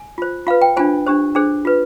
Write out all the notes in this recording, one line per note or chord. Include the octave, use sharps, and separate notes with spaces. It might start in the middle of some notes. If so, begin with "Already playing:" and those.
Already playing: G#5
F4 C5
F4 B4 F5
G5
D4 F4 C5 G#5
D4 G4 C5
D4 G#4 C5
F4 B4